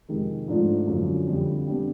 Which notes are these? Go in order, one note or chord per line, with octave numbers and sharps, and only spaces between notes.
F2 C3 D#3 G#3
G#2 F3 A3 D4 F4
F#2 D3 F3
F2 D3 G3
D3 G3 B3 D4 G4